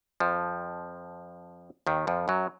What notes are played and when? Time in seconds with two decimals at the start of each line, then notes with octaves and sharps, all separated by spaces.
0.20 F2 F3
1.87 D#2 D#3
2.07 F2 F3
2.28 F#2 F#3